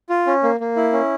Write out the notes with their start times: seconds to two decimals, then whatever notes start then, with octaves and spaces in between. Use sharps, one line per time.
0.09 F4
0.27 C#4
0.43 A#3
0.60 A#3
0.77 E4
0.92 C#4